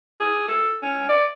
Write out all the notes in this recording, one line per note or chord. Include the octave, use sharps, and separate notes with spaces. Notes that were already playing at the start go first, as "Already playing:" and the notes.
G#4
A4
C#4
D5